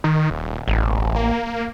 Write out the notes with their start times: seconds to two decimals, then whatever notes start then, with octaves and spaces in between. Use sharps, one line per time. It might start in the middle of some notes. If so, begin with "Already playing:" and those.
0.04 D#3
0.30 D#1
0.68 E1 A1
1.16 A#3